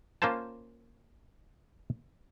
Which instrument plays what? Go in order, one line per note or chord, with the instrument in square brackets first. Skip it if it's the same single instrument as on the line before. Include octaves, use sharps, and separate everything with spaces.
[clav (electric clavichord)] A#3 C#4 F4 C5 A5